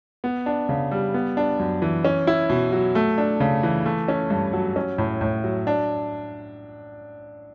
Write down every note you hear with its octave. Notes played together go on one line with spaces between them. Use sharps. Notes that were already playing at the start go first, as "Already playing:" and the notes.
B3
D4
C#3
G3
B3
D4
F#2
E3
C#4
E4
B2
F#3
A3
D4
C#3
E3
A3
C#4
G2
F#3
C#4
A2
A2
F#3
D4